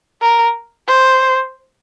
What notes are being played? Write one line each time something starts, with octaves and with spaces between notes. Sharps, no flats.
A#4
C5